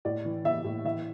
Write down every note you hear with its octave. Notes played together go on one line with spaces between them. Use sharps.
A2 D5
E3
E3 E5
A2
E3 E5